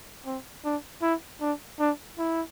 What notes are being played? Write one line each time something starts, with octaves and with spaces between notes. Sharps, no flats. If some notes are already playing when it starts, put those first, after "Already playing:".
C4
D4
E4
D4
D4
E4